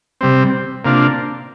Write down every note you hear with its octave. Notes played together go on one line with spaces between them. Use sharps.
C3 G3 C4
C3 A#3 D4 F4